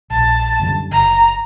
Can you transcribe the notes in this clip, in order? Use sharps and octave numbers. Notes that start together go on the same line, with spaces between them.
A#1 A5
F#2 D3 G3
F#1 A#5